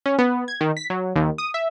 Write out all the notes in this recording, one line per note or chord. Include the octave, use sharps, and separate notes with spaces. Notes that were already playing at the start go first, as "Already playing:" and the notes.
C#4
B3
G#6
D#3
B6
F#3
D#2
D#6
E5